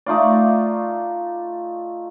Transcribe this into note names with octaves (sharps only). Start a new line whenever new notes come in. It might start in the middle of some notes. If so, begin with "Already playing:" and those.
A3 D#4 F4 D5